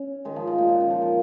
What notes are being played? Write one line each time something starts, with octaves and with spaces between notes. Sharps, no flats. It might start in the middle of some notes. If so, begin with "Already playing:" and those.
Already playing: C#4
D#3 G#3
F3
F3
A#2
C#3
D#3
F3
F3